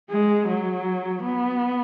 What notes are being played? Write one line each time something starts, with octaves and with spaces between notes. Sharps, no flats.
G#3
F#3
B3